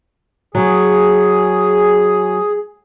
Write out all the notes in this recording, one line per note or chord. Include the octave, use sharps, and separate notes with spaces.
F#3 G#4